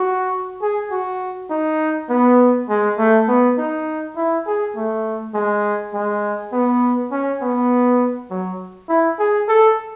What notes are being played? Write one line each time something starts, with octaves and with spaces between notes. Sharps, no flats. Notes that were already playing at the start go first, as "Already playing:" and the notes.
Already playing: F#4
G#4
F#4
D#4
B3
G#3
A3
B3
D#4
E4
G#4
A3
G#3
G#3
B3
C#4
B3
F#3
E4
G#4
A4